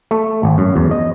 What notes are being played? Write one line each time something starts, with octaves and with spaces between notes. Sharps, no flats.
A3
G#1
F#2
E2
D#5